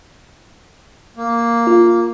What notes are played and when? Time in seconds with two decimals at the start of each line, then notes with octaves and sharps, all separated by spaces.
1.17 A#3
1.67 F4